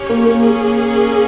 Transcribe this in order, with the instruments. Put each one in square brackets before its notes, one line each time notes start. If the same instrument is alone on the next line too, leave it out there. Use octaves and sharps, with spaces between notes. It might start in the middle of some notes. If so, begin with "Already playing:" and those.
Already playing: [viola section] C#4 G4 C#5
[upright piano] A#3
A#3
[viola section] A#3 C#4 G#4